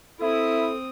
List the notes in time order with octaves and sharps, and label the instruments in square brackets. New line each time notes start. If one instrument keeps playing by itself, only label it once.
[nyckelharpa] C4 D#6 [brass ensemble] E4 [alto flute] A4